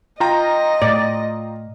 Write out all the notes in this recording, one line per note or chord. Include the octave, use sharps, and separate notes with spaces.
F4 D#5 G5 A#5
A2 D5